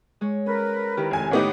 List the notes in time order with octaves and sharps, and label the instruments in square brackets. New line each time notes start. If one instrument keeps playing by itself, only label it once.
[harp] G#3 C#5
[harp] C#4 [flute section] A#4 B4
[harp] D#3 E4 G4
[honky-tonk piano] F1 G#5
[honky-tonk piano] A2 B3 D#4 [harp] G4 B4 C#5 [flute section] D6